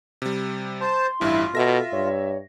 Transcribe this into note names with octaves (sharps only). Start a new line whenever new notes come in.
C3 G3
C5 A5 C6
A1 G2 E4 F4
B2 A4 E5 A#6
G2 C#5